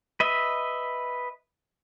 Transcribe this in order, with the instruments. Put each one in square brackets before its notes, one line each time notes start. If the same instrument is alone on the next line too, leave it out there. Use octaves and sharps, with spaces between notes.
[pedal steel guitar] B4 D#5 E5